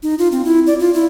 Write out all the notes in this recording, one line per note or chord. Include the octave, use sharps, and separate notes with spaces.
D#4
F4
C4
E4
D5
F4
E4